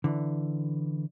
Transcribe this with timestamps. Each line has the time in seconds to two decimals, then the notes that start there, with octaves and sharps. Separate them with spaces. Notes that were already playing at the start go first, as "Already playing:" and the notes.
0.04 D3 E3